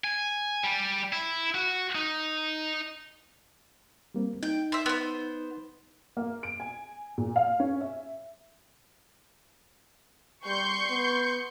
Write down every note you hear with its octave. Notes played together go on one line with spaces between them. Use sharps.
G#5
G3
E4
F#4
D#4
G3 A#3 C4
D#4 G5
C5 E5
B3 C5
A#3
D7
G#5
A#2
F5
C#4
E5
G3 C6 C#6 G6
B3